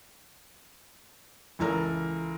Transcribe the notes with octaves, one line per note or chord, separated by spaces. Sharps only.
C#2 E3 A4 A#4